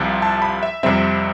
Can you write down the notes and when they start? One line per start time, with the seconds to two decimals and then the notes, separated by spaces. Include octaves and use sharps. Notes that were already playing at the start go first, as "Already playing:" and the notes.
Already playing: C2 C3 F3
0.22 A5
0.42 B5
0.63 E5
0.83 F2 C3 G3 C4 E5